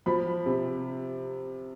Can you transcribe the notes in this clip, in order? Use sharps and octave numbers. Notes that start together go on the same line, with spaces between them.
F3 B5
C3